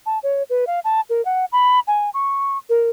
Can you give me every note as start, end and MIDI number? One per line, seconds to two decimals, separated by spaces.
0.06 0.19 81
0.23 0.43 73
0.50 0.65 71
0.67 0.80 77
0.84 1.01 81
1.10 1.24 70
1.25 1.45 78
1.52 1.80 83
1.87 2.10 80
2.14 2.58 85
2.69 2.90 70